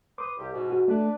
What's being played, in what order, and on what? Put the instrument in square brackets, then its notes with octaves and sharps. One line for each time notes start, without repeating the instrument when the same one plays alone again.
[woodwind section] B4 C6 D#6 [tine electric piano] D6
[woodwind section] C2 G4
G#2 B2
[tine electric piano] F#4
[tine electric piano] A3 [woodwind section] D4 B4